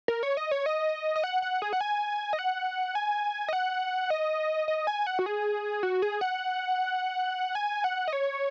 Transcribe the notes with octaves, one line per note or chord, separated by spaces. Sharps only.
A#4
C#5
D#5
C#5
D#5
D#5
F#5
F#5
G#4
F#5
G#5
D#5
F#5
G#5
D#5
F#5
D#5
D#5
G#5
F#5
F#4
G#4
F#4
G#4
F#5
G#5
F#5
D#5
C#5